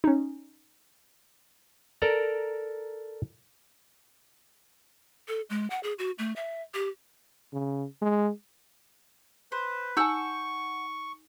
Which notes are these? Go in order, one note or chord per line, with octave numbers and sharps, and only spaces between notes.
C#4 D#4
A4 A#4 D5 A#5
A4
G#3
F#5
G#4
F#4
A3
E5
G4
C#3
G#3
B4 C5
D#4 F#5 G#5 C#6 E6 G6